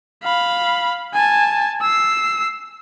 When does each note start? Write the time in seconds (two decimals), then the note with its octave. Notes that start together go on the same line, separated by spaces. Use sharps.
0.23 F5 B5
1.14 G#5 A5
1.82 E6 C7